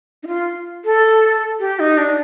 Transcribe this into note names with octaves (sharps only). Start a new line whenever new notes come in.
D#4
F4
A4
G4
D#4
D4